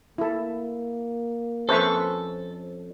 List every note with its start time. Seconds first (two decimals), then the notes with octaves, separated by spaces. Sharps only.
0.18 A#3 E4 A4
1.69 F2 C#4 A4 B4 C5 E5 C#6